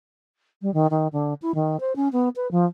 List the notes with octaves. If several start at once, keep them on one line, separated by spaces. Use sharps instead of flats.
G3
D#3
D#3
D3
E4
D#3
C5
C#4
B3
B4
F3